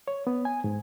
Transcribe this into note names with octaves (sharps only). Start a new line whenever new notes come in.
C#5
B3
G#5
G#2